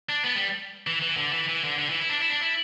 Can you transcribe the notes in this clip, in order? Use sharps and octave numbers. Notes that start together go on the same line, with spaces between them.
D4
B3
G3
E3
E3
D3
E3
E3
D3
D3
E3
E4
D4
E4
D4
E4